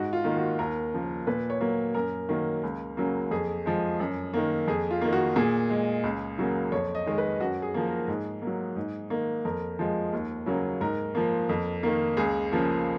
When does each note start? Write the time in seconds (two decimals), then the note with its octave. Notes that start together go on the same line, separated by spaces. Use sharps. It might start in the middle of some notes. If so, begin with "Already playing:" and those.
Already playing: G#2 F#4
0.13 F4
0.24 D#3 A#3
0.37 F#4
0.59 D#2 A#4
0.93 C#3 F3 A#3
1.27 A#2 B4
1.50 C#5
1.61 F#3 A#3
1.94 F#2 A#4
2.29 D#3 F#3 A#3
2.63 C#2
2.97 C#3 F#3 A#3
3.31 F2 G#4
3.66 F3 G#3
4.00 F#2
4.34 D#3 A#3
4.67 F2 G#4
4.91 F4
5.02 D#3 A#3
5.13 F#4
5.36 A#2 G#4
5.70 G#3
6.04 C#2
6.38 C#3 F#3 A#3
6.72 F2 C#5
6.95 D#5
7.07 D#3 G#3
7.18 B4
7.40 F#2 F#4
7.62 G#4
7.74 F3 A#3
7.86 A#4
8.08 G#2 G#4
8.42 F#3 A#3
8.76 G#2
9.10 D#3 A#3
9.45 F2 A#4
9.79 F3 G#3
10.13 D#2
10.46 C#3 F#3 A#3
10.81 G#2 A#4
11.15 F3 A#3
11.49 F2
11.83 D#3 A#3
12.17 C#2 G#4
12.52 C#3 F3 A#3